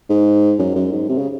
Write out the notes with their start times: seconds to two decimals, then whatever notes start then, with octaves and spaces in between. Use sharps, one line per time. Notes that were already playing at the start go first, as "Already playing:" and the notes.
0.09 G#2
0.59 F#2
0.75 F#2
0.92 G#2
1.09 C3
1.18 C#3